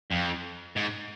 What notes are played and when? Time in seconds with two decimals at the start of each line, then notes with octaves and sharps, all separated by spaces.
0.11 F2
0.77 G#2